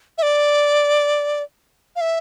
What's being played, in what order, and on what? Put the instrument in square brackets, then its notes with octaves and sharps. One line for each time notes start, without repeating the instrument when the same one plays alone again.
[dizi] E5
D5
F5
E5